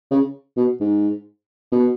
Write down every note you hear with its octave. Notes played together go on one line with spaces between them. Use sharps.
C#3
B2
G#2
B2